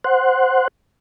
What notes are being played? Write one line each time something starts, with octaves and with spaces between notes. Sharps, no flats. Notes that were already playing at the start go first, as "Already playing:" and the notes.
C5 F#5